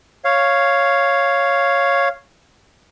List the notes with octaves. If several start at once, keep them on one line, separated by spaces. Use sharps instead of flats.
C#5 F5